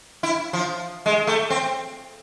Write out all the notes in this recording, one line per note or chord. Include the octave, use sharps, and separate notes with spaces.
E4
F3
G#3
A3
C4